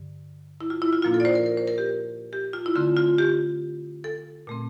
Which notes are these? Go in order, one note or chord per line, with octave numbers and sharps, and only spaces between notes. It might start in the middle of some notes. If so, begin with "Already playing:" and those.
Already playing: G2 D3
E4
F4
E4
F4
A#2 F3 A#3 D4 F4
A4
D5
C5
A#4
A#4
C5
A#4
G4
G4
F4
E4
D3 A3 C4 F4
F4
G4
A4
A#2 A3 C4